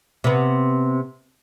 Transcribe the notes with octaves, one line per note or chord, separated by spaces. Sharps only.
C3 B3